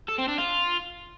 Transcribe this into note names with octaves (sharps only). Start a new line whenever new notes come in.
A4
C4
D4
F4